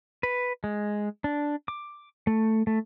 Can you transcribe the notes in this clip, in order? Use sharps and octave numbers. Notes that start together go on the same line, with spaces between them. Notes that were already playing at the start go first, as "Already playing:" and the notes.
B4
G#3
D4
D6
A3
A3